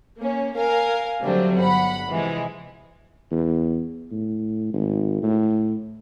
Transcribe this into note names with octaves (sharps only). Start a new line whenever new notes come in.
A#3 C#4
A#4 F5 G#5
D3 F#3 G3 A3 C4
G1 F#5 B5
C3 E3 F3 G#3
E2
A2
G#1
A2